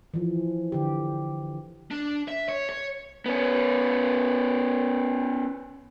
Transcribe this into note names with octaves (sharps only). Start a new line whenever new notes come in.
E3 F3
D3 G4
D4
E5
C#5
C#5
B3 C#4